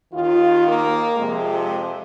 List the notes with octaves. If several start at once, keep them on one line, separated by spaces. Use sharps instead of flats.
D#2 D#3 F4
A#3
F2 C3 F3 G#3